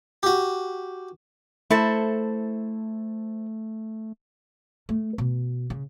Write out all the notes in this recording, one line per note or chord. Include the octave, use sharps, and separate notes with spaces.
F#4 G4
A3 E4 A4 C5
A3
B2
C#3